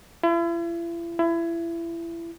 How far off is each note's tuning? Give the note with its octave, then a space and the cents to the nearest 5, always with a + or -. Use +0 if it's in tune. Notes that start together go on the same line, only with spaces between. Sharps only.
E4 +40
E4 +25